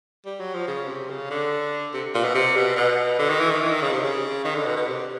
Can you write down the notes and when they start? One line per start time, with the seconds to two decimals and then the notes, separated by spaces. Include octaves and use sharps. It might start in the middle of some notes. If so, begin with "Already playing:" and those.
0.26 G3
0.40 F#3
0.54 F3
0.67 C#3
0.88 C3
1.10 C#3
1.30 D3
1.93 C3
2.14 A#2
2.24 B2
2.35 C3
2.56 B2
2.77 B2
3.19 D3
3.29 D#3
3.40 E3
3.51 D#3
3.61 E3
3.71 D#3
3.82 C#3
3.92 C3
4.03 C#3
4.45 D#3
4.55 D3
4.66 B2
4.76 B2
4.87 C3